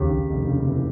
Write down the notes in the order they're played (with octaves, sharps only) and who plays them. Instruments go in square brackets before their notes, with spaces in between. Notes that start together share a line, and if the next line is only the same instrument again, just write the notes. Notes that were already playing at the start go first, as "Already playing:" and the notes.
Already playing: [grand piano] D#2 C#3 G4
D#2
F1
C#3
E3